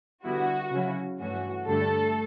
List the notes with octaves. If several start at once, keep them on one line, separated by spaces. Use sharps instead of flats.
D3 G3 B3 E4 F#4
C#3 F#3 C#4 E4
G2 E3 A3 C#4 F#4
G2 D3 G3 A3 D4 A4